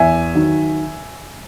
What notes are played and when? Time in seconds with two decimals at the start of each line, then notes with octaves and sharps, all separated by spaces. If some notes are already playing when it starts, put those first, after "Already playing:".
Already playing: E2 E5 G#5
0.35 D#3 F#3